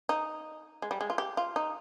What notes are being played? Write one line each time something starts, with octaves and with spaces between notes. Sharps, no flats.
D#4
G#3
G3
G#3
F4
G4
F4
D#4